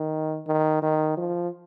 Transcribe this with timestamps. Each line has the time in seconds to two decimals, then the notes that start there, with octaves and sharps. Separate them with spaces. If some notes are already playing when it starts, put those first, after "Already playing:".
Already playing: D#3
0.48 D#3
0.82 D#3
1.17 F3